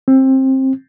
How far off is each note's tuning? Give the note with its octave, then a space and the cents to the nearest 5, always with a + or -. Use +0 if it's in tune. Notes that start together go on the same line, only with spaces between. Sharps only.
C4 +20